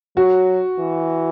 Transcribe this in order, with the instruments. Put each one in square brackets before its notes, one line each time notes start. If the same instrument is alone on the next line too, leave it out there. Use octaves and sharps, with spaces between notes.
[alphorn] F#3 [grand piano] F#4
[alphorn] E3